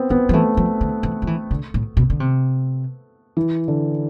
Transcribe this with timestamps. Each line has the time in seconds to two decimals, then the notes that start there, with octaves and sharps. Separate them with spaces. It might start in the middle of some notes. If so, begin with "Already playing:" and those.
Already playing: B3 C4
0.10 E3 B3
0.29 F3
0.33 E3 A3
0.57 F3
0.81 D3
1.03 E3
1.22 F3
1.27 E3
1.51 D3
1.74 A2
1.97 B2
2.10 D3
2.20 C3
3.37 E3
3.68 D3